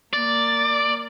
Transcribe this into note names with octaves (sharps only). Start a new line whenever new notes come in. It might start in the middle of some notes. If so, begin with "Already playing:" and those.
A#3 D5